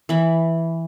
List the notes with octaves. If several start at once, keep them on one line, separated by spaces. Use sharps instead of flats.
E3 B5